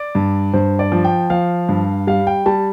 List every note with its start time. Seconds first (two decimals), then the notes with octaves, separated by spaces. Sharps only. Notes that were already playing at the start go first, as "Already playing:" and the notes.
Already playing: D5
0.15 G2
0.54 G2 C5
0.79 D5
0.92 F3
1.04 G5
1.30 F3 F5
1.69 G2
2.07 G3 F5
2.27 G5
2.46 G3 A5